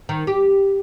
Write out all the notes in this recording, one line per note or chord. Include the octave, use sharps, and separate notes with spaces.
D#3
G4